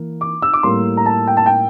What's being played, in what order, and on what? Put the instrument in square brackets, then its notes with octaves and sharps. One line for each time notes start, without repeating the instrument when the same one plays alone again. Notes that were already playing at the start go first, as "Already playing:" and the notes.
Already playing: [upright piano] E3 A#3
D6
E6
D6
A2 G3 A#3 C6
A#5
A5
G5
A5
G5